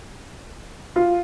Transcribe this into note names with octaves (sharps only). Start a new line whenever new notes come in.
F4